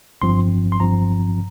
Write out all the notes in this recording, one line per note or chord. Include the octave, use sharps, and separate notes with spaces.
G1 G2 F3 C4 C6
C6
G1 G2 F3 C4 A#5